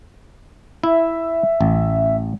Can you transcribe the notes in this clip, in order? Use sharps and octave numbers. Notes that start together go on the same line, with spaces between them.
E4 E5
A1